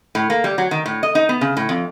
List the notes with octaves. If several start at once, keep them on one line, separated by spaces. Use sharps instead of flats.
A2
A#3
G3
F#3
D#3
A2
D#5
D#4
B3
C#3
A2
F2